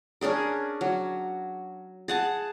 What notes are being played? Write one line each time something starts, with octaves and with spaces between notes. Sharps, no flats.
C#4 D4 G#4 A#4
F#3
G#4 F#5 A5